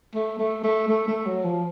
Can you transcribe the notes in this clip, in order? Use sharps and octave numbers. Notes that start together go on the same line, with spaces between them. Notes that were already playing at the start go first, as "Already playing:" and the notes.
A3
A3
A3
A3
A3
F#3
F3